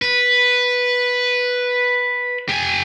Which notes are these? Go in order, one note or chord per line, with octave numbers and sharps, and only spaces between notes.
B4
G4 G#5